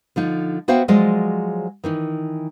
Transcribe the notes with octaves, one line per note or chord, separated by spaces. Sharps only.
D3 F3 D#4
B3 F#4 C5 E5 F5 G5
F3 F#3 G#3 D5 D#5
D#3 E3 D#4